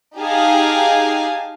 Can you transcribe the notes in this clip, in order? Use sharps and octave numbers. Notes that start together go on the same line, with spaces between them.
D#4 G4 G#4 F5 G#5 A5